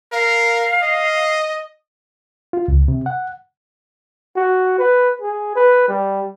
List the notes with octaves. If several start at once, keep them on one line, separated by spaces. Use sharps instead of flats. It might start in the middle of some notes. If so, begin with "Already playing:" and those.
A#4 F5
D#5
F4
C#2
C3
F#5
F#4
B4
G#4
B4
G3